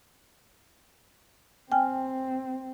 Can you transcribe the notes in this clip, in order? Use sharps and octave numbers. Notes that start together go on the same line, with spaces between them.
C4 G5 G#5 F6